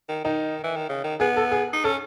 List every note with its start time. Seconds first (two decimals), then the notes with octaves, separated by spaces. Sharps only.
0.09 D#3
0.24 D#3 D#4
0.64 E3
0.76 D#3
0.89 C#3
1.04 D#3
1.20 B3 G#4
1.36 A4
1.52 G#4
1.73 D#4
1.84 C#4 A4